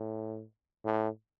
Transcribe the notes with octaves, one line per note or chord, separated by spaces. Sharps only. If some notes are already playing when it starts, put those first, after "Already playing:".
Already playing: A2
A2